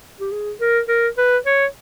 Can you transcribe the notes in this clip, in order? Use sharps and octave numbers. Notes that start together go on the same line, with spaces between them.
G4
G#4
A#4
A#4
B4
C#5